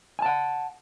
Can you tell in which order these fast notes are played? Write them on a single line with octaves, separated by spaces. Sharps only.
G#5 A5 F#5